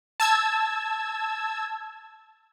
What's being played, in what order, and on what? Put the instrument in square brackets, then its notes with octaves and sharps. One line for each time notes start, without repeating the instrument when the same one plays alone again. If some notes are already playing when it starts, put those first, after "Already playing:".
[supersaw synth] A5 E6 G#6